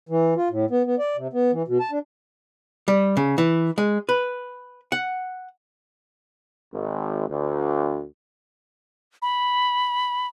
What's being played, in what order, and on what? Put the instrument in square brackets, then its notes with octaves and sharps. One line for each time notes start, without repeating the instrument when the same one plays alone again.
[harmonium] E3
F4
A2
B3
B3
D5
C3
B3
E3
B2
A5
D4
[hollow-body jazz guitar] G3
C#3
E3
G#3
B4
F#5
[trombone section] G#1
D2
[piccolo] B5